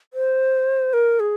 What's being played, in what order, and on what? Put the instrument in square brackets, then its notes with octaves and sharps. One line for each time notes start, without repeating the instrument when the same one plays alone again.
[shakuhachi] C5
A#4
G#4